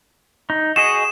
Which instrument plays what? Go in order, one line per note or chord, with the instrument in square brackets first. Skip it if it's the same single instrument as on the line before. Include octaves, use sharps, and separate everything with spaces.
[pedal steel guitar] D#4
[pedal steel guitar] F#4 G#4 D#5 [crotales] E7